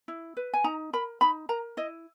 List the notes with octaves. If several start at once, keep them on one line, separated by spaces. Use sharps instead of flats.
E4
B4
G#5
D#4 A#5
A#4 B5
D#4 B5
A#4 A#5
E4 D#5